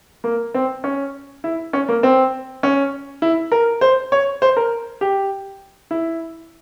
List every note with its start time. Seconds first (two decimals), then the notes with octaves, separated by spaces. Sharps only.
0.24 A#3
0.54 C4
0.84 C#4
1.44 E4
1.73 C#4
1.89 A#3
2.03 C4
2.63 C#4
3.22 E4
3.52 A#4
3.81 C5
4.12 C#5
4.42 C5
4.57 A#4
5.01 G4
5.91 E4